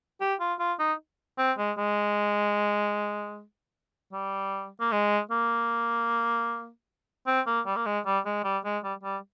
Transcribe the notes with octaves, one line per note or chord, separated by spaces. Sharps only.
G4
F4
F4
D#4
C4
G#3
G#3
G3
A#3
G#3
A#3
C4
A#3
G3
A#3
G#3
G3
G#3
G3
G#3
G3
G3